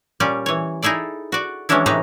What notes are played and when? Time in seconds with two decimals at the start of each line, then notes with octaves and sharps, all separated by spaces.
0.20 A#2 G3 C#4 D5
0.46 E3 C#5
0.82 D#4 E4 G#4 A4 D5
1.32 F#4 D5
1.69 E3 F#3 G#3 C#4 D4 E4
1.86 A2 C3 E3 D#4 B4 A#5